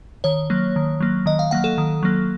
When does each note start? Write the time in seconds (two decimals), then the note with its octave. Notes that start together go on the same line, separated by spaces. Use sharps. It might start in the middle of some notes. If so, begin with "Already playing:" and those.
0.24 D#3 C#5
0.50 F#3 A#3
0.76 D#3
1.00 F#3 A#3
1.26 D#3 D#5
1.39 F5
1.51 F#3 A#3 F#5
1.64 A4
1.78 D#3
2.03 F#3 A#3